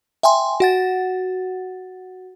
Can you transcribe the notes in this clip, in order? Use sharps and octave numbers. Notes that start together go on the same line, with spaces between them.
E5 G5 G#5 C6
F#4 F#5 A6